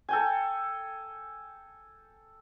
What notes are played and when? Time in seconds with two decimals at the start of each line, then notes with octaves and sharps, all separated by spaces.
0.08 A4 G5 G#5